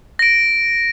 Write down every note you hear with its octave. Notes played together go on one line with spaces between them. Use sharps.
A#6 D7